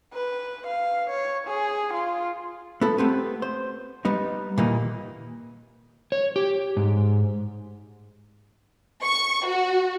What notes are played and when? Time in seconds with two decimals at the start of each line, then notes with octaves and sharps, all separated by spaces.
0.13 B4
0.67 F5
1.10 C#5
1.47 G#4
1.94 F4
2.81 B3 E4 A4
2.98 A3 B3 C4 G4 B4
3.42 C5
4.05 G3 B3 D#4
4.58 A#2 D#3 E3 G3 A#3 D#4
6.12 C#5
6.36 G4
6.77 G#2
9.03 C#6
9.46 F#4